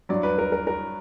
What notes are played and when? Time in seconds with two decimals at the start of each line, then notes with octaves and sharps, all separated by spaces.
0.09 G2 F#3 D5
0.23 B4
0.38 A#4
0.52 A#4
0.67 A#4